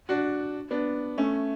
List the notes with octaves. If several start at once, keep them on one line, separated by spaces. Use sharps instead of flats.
D4 F#4
B3 D4
A3 C#4